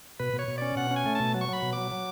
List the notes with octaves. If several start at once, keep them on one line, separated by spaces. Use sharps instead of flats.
B2 B4
B2
C#5
B2
C#4 D5
B2 F#5
C#4
G#5
A3
B2 A5
F#3
C#6
F#3 B5
B2
F#3 D6
F#3